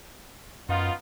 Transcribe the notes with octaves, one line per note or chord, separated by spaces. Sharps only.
F#2 B3 D#4 F4